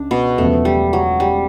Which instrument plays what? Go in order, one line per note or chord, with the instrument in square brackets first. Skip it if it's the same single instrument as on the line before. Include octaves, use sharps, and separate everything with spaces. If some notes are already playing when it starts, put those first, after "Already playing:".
Already playing: [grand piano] C#2 C#3 [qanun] D4
[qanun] B2 B3
[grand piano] E1 E2 C#3 F3 [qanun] A3
[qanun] G3
F#3
G3